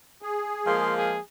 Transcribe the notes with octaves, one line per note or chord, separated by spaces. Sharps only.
G#4
F3 G#3 A#3 C6
G#4